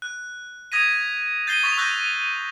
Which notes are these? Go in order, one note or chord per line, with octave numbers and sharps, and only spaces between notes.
F#6
D#6 G#6 A#6 B6 D#7
G6 A6 A#6 C7 D#7 G7
C#6 D#6 A6 B6 F7
C#6 E6 F#6 G6 A6 A#6